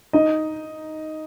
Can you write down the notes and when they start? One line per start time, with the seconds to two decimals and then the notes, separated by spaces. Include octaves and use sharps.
0.13 D#4 D#5